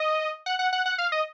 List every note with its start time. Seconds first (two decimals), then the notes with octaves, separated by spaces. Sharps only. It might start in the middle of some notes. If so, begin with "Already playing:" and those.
Already playing: D#5
0.46 F#5
0.59 F#5
0.73 F#5
0.86 F#5
0.98 F5
1.12 D#5